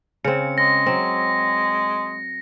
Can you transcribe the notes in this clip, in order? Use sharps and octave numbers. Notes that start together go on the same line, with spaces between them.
C#3 C4 C#7
G#3 A#6
F#3 C4